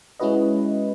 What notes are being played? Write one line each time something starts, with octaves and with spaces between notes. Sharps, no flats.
G#3 C#4 E4 F#4 B4 D#5